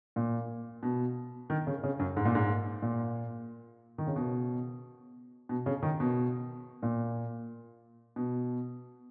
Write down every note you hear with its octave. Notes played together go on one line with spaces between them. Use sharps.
A#2
B2
D#3
C#3
C#3
F#2
G#2
A#2
G#2
A#2
D#3
C#3
B2
B2
C#3
D#3
B2
A#2
B2